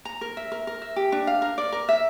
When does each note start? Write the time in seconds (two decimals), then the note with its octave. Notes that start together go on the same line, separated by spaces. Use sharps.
0.05 A#5
0.21 A#4
0.37 E5
0.52 A#4
0.67 A#4
0.82 E5
0.96 G4
1.12 D4
1.27 F5
1.42 A#4
1.58 D5
1.72 A#4
1.89 E5